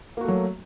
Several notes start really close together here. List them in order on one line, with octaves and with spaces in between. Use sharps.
A#3 F#4 A3 F#3